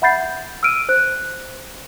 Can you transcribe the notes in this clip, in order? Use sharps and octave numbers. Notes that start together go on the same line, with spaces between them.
E5 F#5 B5 G6 A6 C7
E6 F6 D7 D#7
C5 F#6